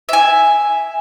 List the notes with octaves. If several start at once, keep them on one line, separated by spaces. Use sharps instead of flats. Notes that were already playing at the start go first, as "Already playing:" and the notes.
E5 G#5